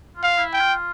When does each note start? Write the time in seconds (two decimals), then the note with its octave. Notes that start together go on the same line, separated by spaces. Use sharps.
0.16 F4
0.23 F5
0.38 E4
0.53 G5
0.61 F4